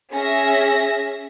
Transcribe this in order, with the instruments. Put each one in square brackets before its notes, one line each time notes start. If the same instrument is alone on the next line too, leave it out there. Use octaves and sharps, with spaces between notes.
[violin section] C#4 G#4 E5 A#6